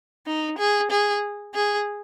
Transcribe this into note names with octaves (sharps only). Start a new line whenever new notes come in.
D#4
G#4
G#4
G#4